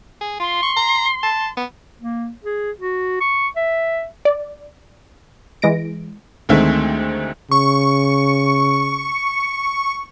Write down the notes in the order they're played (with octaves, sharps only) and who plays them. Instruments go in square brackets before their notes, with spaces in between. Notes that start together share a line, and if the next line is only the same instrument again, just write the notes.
[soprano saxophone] G#4
[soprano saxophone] F4 [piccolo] C6
[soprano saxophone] C#6
A#5
A5
B3
[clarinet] A#3
G#4
F#4
C#6
E5
[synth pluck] D5
E3 G#3 A#6 D7
[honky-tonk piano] D2 D#3 G#3 A3 C4 E5
[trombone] C#3 [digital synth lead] C#6